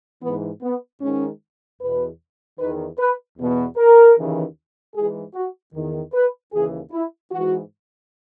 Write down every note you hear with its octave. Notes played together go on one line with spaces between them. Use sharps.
G#2 E3 B3
B3
G#2 D#3 C#4
E2 B2 B4
E2 D#3 B4
B4
E2 B2
A#4
D#2 C#3 E3
G#2 E3 G#4
F#4
E2 D#3
B4
D#2 C#3 E3 G#4
E4
G#2 E3 F#4